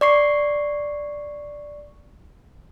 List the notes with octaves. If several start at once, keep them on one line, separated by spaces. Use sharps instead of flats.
D5 C#6 C7